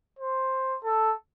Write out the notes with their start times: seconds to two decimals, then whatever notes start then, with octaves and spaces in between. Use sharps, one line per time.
0.19 C5
0.84 A4